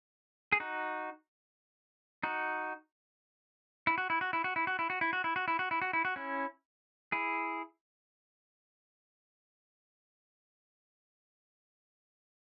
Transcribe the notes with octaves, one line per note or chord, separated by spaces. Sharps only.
G#4
D#4 F#4
D#4 F#4
E4
F#4
E4
F#4
E4
F#4
E4
F#4
E4
F#4
E4
F#4
E4
F#4
E4
F#4
E4
F#4
E4
F#4
C#4 E4
E4 G#4